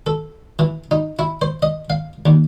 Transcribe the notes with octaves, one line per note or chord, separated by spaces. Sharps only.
A4
E3
D#4
E4
C5
D#5
F5
D#2